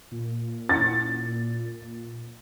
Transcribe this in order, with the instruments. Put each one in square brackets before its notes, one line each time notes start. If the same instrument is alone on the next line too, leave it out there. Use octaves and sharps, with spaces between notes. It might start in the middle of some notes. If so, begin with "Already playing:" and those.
[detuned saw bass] A#2
[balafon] C#4 E4 [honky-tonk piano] A6